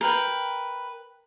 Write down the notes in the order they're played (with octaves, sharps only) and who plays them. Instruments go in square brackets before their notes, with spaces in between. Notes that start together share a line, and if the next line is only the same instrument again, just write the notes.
[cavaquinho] A#4 B4 G5